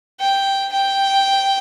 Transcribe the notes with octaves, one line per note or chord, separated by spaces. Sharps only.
G5
G5